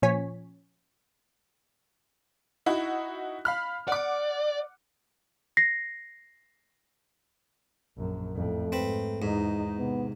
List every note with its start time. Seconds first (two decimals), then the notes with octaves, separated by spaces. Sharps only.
0.02 A#2 F3 C#4 C#5 G#5 B6
2.66 D#4 E4 F#4
3.45 F5 B5 F6
3.88 D5 F#5 D6
5.57 A#6 C7
7.97 A#1 F#2
8.35 F2 A2 A3
8.72 G#2 C4 B4
9.22 E2 G#2 D#4
9.78 C3 B3